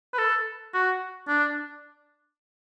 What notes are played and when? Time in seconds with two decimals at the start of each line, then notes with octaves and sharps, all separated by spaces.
0.14 B4
0.18 A4
0.74 F#4
1.28 D4